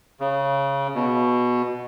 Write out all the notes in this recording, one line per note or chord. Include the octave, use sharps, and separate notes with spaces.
C#3
B2